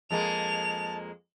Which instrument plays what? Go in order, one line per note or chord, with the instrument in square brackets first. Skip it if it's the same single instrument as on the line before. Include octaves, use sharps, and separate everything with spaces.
[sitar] F2 G#3 A#3 [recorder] A5 [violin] F7